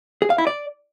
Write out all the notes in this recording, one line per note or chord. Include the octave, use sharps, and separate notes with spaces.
G#4
F5
E4
D5